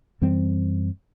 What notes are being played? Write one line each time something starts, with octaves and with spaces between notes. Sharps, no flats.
F#2 E3 G3 C4